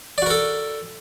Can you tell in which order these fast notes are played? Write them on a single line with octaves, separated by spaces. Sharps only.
D5 F#4 A#4 A4